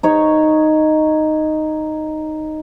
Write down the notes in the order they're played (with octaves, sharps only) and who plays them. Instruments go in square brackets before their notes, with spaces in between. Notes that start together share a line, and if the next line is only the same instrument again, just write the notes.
[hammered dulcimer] D#4 C#5 C#6